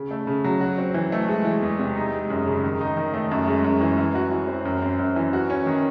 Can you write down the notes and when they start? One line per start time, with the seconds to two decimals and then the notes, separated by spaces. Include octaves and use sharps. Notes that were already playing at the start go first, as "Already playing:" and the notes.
Already playing: C#3
0.11 A3
0.27 C#3
0.44 F#3
0.61 F#4
0.78 C4
0.94 E3
1.12 A3
1.28 G#3
1.45 E3
1.62 E2
1.79 C3
1.96 D#4
2.13 G#3
2.30 F#2
2.47 C#3
2.64 D#3
2.81 D#4
2.97 D#3
3.14 A3
3.31 F#2
3.47 G#3
3.64 F#2
3.81 E3
3.98 E3
4.15 F#4
4.31 E3
4.48 C4
4.65 F#2
4.82 C4
4.99 F#2
5.16 E3
5.33 F#4
5.50 C#4
5.66 D#3